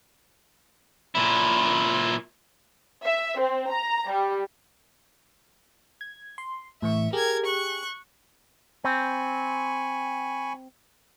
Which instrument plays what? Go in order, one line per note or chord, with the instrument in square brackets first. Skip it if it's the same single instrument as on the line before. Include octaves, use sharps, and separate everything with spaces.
[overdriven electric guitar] A#2 E4
[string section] E5
C4
A#5
G3
[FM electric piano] G#6
C6
[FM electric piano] A2 E3 C#6 [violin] E5
[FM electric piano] G4 G#4 [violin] A#4 G#6
[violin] C#6 F#6
[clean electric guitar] C4 [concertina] G#5 B5 C#6